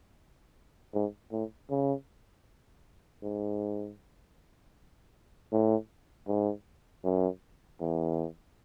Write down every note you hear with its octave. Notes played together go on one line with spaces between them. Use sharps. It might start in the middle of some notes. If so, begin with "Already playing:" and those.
G#2
A2
C#3
G#2
A2
G#2
F#2
E2